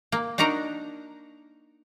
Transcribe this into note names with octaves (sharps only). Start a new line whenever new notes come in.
A#3
D4 D#4 F#4 A#4 A#5